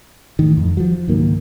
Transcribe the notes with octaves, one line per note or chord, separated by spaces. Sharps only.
A2 D#3
F2
F3 F#3
C#2 G#2 D#3 A#3